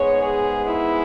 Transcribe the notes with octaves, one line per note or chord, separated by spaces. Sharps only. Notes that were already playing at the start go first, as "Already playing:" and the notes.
Already playing: G#2 G#3 B3 C#5
G#4
E4